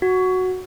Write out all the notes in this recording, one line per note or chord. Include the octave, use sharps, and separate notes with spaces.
F#4